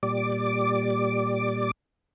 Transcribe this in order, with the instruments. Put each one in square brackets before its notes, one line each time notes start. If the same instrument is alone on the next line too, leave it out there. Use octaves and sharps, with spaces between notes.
[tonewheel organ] A#2 G3 D5 D6